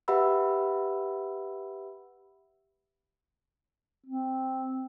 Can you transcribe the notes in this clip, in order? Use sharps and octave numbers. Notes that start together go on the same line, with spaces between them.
G4 B4 E5 F#5 B5 E6
C4